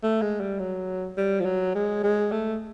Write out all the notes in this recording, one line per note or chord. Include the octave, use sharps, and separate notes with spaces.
A3
G#3
G3
F#3
G3
F3
F#3
G#3
G#3
A3